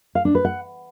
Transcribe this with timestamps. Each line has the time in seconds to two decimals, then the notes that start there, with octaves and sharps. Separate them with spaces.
0.15 F5
0.25 D4
0.35 B4
0.45 F#5